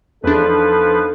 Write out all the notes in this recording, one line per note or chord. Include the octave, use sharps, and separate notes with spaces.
E2 F3 B3 D4 D#4 A4 B4